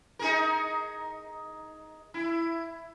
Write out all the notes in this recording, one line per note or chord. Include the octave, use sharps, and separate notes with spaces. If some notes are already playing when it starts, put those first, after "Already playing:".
D#4 G#4 A#4
E4